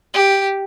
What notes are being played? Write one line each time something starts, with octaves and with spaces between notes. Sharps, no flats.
G4